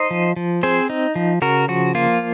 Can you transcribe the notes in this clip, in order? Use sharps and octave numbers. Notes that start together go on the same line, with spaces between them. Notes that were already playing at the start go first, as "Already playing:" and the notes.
Already playing: D#4 C5 D#5
F3
F3
C4 G#4 C5
D#4
F3
C#3 F#4 A#4
F3 F#4
A#3 F4